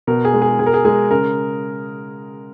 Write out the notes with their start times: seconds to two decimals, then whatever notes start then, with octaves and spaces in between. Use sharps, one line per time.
0.07 B2 A#4
0.25 G#4
0.33 G#3
0.42 G#4
0.59 B2 G#4
0.66 A#4
0.74 G#4
0.85 G#3 G#4
1.11 C#3 A#4